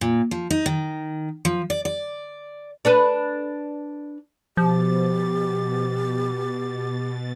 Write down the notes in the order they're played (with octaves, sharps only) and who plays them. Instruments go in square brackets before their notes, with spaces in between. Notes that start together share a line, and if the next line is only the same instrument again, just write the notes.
[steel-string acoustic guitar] A#2
F3
D#4
D#3
F3
D5
D5
[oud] D4 A4 B4
[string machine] B2 A6 [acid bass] F3 [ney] G4